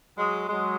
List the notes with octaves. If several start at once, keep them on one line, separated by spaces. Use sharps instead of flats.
F#3 G#3
F#3 G#3